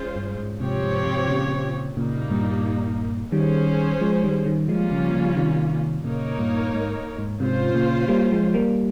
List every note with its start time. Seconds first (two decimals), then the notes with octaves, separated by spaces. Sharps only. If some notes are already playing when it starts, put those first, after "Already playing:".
Already playing: G#3 C#4 F4 C5
0.16 G2
0.38 G#2
0.60 G#2 C3 F3 C4 G4 C#5
0.83 G#2 C3
1.07 G#2 C3
1.28 A#2 C#3
1.97 A#2 C#3 G3 A#3 D#4
2.31 G2 A#2
3.32 D#3 G3 C#4 G#4 C5
4.01 F3 G#3
4.23 D#3 G3
4.46 D#3 G3
4.68 F3 G3 G#3 A#3 C#4 F4
4.91 C#3 F3
5.14 C#3 F3
5.36 C3 D#3
6.04 A#2 C#3 A#3 D#4 A#4 C#5
6.39 G2 A#2
6.73 G#2
7.19 G#2
7.40 G#2 C3 C#4 F4 C5
7.74 A#2 C#3
8.08 G3 A#3
8.32 F3 G#3
8.54 G3 A#3